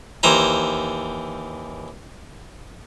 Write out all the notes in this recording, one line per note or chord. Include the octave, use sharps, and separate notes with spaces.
D#2 E3 C5 A#5